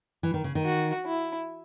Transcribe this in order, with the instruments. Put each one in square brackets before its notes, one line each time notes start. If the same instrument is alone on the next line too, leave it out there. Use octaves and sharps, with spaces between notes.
[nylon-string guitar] E3
D#3
C#3
D#3
[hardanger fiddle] F#4
E4